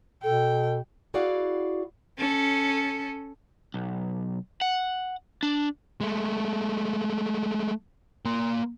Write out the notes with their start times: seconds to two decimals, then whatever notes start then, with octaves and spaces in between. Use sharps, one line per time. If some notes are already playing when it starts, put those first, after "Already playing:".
0.23 B2 A4 G5
1.14 E4 F#4 G#4 D5 F5 F#5
2.18 C#4 A4
3.74 B1
4.61 F#5
5.43 D4
6.01 G#3 A3
8.25 A#3 C6